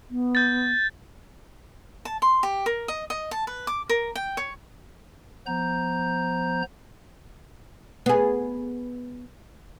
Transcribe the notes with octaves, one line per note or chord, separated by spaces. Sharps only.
B3
G6 A6
A5
C6
G4
A#4
D#5
D#5
A5
B4
D6
A#4
G5
C#5
F3 B3 C5 A#5 G6
B3 G#4